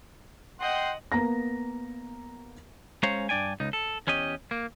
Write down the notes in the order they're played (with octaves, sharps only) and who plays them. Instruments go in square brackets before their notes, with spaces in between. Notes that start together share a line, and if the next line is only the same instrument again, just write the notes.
[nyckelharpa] D#5 [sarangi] F#5 [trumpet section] G5 C6
[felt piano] A#3 B3 A#5 A#6
[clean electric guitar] G#3 C#4 C5 C#5 F5 A#5
G2 D4 D5 G5 G#5
C#2 D#4
A4
E2 C#4 G4 D#5
A#3